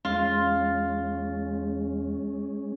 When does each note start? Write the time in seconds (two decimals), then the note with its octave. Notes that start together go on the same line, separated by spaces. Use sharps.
0.05 E2 G#3 C#4 F4